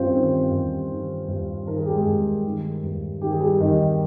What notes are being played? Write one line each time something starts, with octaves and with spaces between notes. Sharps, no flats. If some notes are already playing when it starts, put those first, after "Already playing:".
Already playing: G2 D#3 C4 C#4 F4 C5 F5
D#3
G2
D#3
G2
D#3 A#4
G#4
G4
G#3 G#4
G2
D#3
G2
D#3 G4
G#4
G3 G4
G2 D#3 D#4